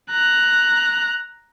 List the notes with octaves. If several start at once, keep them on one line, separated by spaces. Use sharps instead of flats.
A#5 F#6